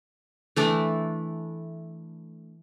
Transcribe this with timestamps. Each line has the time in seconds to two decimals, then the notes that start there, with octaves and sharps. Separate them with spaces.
0.56 E3 A3 D4